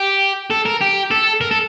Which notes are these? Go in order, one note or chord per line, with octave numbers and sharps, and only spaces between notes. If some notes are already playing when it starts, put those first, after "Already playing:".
Already playing: G4
A4
A#4
G4
A4
A#4
A4